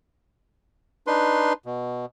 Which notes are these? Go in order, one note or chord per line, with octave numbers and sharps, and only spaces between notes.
D4 D#4 B4 C6
B2